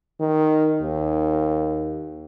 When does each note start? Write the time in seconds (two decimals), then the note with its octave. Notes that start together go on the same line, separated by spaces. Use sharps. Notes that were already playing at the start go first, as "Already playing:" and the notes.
0.20 D#3
0.81 D#2